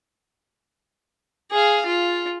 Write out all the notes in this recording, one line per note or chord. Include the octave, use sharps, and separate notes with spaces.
G#4 F5
F4